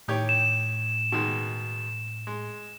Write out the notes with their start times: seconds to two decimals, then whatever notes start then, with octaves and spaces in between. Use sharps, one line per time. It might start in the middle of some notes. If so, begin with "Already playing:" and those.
0.08 A2 D#3 G4 C#5
0.29 E7
1.12 B2 D#3 G#3
2.27 G#3